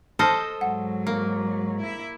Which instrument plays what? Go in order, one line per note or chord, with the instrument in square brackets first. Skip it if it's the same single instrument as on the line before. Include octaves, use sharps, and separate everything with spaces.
[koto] A4 C5 D#5 [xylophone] A5 F6 A#6
[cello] G#2 F#3 [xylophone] F#5
[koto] A#3
[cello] E4 E5